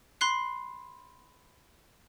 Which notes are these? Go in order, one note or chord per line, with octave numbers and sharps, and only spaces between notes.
B5 C6 F#6 C7